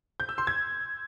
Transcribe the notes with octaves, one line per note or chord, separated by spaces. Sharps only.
G6
E6
C6
G#6